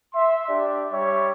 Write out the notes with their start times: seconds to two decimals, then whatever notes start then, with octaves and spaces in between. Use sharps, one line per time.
0.14 E5 C6
0.48 D4 G4 D5
0.91 G3 G4 C#5 E5